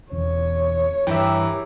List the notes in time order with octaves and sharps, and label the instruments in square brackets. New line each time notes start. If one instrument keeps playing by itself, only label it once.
[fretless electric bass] E1 E2 C#4 [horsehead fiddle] C#5
[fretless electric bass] G2 [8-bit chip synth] E3 [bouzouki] G4 A#4 E5